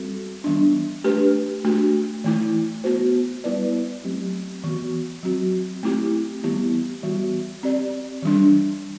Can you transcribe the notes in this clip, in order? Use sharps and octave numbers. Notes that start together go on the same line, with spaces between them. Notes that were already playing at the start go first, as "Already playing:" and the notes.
Already playing: G3 C4 F#4 A4
E3 G3 B3 D4
A3 D4 G4 B4
A3 D4 F#4
E3 A3 E4
B3 F#4 C5
G3 B3 E4 B4 D5
F#3 A3 C4 G4
E3 B3 F#4
F#3 C4 F#4
A3 C4 E4 G4
E3 G3 B3 E4 G4
E3 G3 B3 F#4
C4 G4 D5
E3 G3 D4